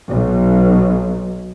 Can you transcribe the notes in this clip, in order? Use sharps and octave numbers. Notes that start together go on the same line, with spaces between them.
B1